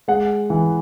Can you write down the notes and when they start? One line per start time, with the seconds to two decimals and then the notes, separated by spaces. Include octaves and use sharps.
0.08 G#3 F#5
0.50 E3